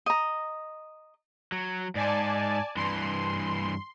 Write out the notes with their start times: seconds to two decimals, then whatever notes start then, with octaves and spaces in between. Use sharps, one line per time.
0.06 D#5 A#5
1.52 F#3
1.95 G#2 D5 G#5 A5
2.77 G2 E3 C6